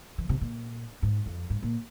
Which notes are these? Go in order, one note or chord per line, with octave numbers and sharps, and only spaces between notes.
E3
C3
A#2
G#2
F2
G#2
A#2